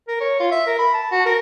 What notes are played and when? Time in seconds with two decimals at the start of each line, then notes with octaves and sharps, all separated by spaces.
0.08 A#4
0.20 C#5
0.40 F4
0.51 E5
0.67 A#4
0.79 B5
0.94 A5
1.11 F#4
1.26 A#4